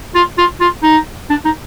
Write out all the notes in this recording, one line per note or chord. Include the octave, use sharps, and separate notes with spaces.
F4
F4
F4
D#4
D4
D#4